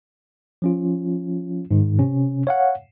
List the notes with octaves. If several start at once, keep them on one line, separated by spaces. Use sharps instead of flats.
F3 C#4 F4
G#2 D#3
C3 C#4
C#5 F5 F#5